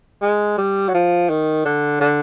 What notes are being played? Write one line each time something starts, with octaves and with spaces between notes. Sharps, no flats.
G#3
G3
F#3
F3
D#3
D3
D3